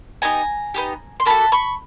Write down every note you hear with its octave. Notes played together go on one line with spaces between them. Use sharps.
B3 D#4 G4 G#5 A#5
B3 D#4 G4
C6
A#3 D4 F#4 A4 A5 B5
B5 C#6